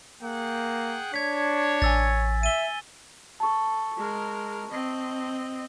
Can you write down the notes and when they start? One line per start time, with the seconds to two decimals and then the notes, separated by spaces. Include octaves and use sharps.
0.22 A#3 G#4 F#5 G5
1.14 D4 C#5 G#6 B6
1.82 A1 G#5 E6 A6
2.43 E5 D#7 G7
3.40 A4 A5 C#6
3.97 G#3 A#4
4.70 C4 D#5